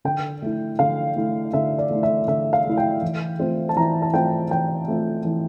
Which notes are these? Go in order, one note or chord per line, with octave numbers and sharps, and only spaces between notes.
D3 G5
A3 E4
D3 F5
A3 E4
D3 E5
D5
A3 E4
E5
D3 E5
F5
A3 E4
G5
E3
A3 C4 F4
A5
E3 A#5
A5
A3 C4 F4 G5
E3 G5
A3 C4 F4
E3